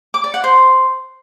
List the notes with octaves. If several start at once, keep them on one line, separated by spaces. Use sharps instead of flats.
D6
D5
F#5
C5